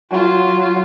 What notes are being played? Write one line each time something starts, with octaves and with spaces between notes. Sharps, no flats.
F#3 F4